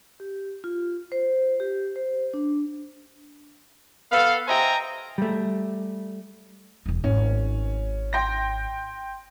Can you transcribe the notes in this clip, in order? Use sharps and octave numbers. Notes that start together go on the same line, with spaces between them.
G4
F4
C5
G4
C5
D4
B3 A4 B4 F5
C5 D#5 E5 G5 G#5 A#5
G3 A3
E1 G#3
G#1 C#4
G5 C6 A#6